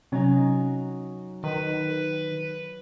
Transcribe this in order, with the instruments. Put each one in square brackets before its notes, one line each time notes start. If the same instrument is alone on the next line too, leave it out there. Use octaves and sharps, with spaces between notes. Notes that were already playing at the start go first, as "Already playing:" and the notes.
[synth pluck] C3 C#4 [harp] F#3 D#4 G#5
[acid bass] D#3 [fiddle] B4